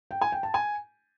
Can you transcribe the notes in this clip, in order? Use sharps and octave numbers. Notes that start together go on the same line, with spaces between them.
G5
G#5
G5
A5
G#5